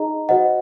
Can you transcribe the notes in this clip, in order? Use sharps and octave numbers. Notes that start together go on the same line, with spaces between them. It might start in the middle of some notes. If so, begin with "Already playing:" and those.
Already playing: D#4 G#4 D#5 A#5
F#4 C5 D#5 F#5